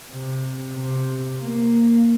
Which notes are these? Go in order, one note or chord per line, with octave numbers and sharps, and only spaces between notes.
C3
C3
A#3